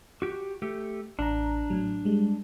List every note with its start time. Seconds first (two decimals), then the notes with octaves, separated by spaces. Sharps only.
0.22 F#4 G4
0.62 A3 G4
1.19 A1 D4 A#5
1.70 A2 F#3
2.05 G3 G#3